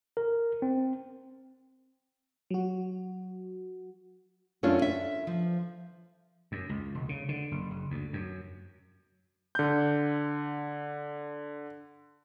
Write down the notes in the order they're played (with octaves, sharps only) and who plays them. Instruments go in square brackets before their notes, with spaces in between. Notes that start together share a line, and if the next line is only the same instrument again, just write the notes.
[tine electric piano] A#4
C4
[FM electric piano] F#3 F#4
[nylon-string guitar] F#2 A3 C#4 D4 F4
E5
F3
[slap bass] F#2
C#2
E1
C#3
D3
F#1
F#1
D2
F#2
[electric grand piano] D3 G6